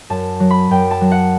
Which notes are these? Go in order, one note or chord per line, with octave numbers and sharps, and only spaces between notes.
F#2 A5
F#3
B5
F#2 G5
A5
F#3
F#5